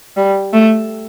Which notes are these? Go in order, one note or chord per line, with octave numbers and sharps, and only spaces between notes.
G3
A3